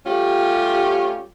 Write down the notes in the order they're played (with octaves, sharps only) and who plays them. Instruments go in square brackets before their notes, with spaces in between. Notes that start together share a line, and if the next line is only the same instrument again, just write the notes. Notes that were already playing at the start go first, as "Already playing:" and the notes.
[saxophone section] G3 A3 C#4 F4 G4